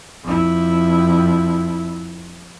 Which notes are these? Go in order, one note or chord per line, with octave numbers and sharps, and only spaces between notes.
F2 E4